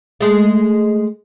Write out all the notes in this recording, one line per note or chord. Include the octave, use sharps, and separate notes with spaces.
G#3 A3